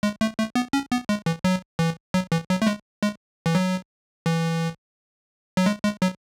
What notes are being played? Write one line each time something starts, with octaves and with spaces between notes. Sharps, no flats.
G#3
A3
A3
B3
C#4
B3
G#3
E3
F#3
E3
F#3
E3
F#3
A3
G#3
G#3
E3
F#3
E3
F#3
G#3
G#3
F#3